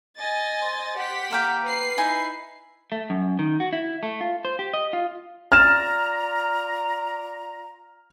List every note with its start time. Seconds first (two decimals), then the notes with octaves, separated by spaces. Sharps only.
0.17 D#5 G#5 A6
0.62 C5
0.97 G4 F#5 B6
1.31 A#3 C5 F5 G5
1.64 B4 C7
1.98 D#4 E4 G#5
2.92 A3
3.10 F#2
3.39 D#3
3.60 F#4
3.73 E4
4.03 A3
4.21 F4
4.45 C5
4.59 G4
4.73 D#5
4.93 F4
5.52 F4 D5 A#5 F6 A6 E7